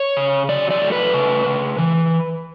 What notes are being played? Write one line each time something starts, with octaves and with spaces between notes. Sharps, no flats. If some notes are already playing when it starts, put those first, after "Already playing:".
Already playing: C#5
C#3
F#3 D5
D5
A3
B4
C#3
C#3
E3